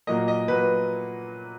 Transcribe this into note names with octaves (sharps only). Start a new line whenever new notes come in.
A#2 F#3 A#3 D#5
D#5
A#2 F#3 A#3 B4